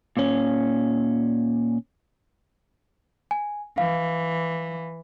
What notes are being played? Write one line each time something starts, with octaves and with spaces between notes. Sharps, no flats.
A#2 C#4
G#5
E3 F5